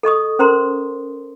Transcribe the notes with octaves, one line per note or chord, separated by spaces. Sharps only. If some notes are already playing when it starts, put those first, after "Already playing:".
A4 D#5 C#6 D#6
C#4 A#4 C5 A#5 C6